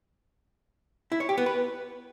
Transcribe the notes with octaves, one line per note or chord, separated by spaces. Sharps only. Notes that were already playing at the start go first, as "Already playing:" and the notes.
E4
C#5
G4
B3
B4